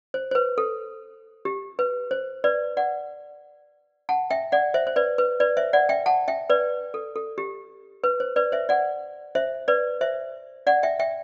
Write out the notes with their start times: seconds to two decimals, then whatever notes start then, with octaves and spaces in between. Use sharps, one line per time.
0.14 C5
0.31 C5
0.35 B4
0.58 A4
1.45 G4
1.79 B4
2.11 C5
2.44 B4 D5
2.77 D5 F#5
4.09 F#5 A5
4.30 E5 G5
4.52 D5 F#5
4.74 C5 E5
4.87 C5
4.96 B4 D5
5.18 B4
5.40 B4 D5
5.57 C5 E5
5.73 D5 F#5
5.89 E5 G5
6.06 F#5 A5
6.28 E5 G5
6.50 B4 D5
6.94 A4
7.16 A4
7.38 G4
8.04 B4
8.20 C5
8.36 B4 D5
8.52 C5 E5
8.69 D5 F#5
9.35 C5 E5
9.68 B4 D5
10.01 C5 E5
10.67 D5 F#5
10.83 E5 G5
11.00 E5 G5